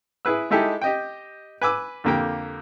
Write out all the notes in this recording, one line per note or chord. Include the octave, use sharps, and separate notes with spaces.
E4 G#4 B4 E6
G#3 D#4 E4 G4 A4 G#5
G4 D#5 G5
B4 G#5 D6 E6
F2 D3 A#3 G4 G5